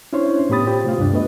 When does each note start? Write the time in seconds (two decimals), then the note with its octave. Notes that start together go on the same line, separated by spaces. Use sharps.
0.13 C#4 D4 E4 C5 C#5 C6
0.49 A2 B3 G4 B5 D#6 A6
0.67 F4 G4 C5
0.84 C3 A3 F4
0.98 D2 G2 D4
1.13 A3 B3 B4 D#5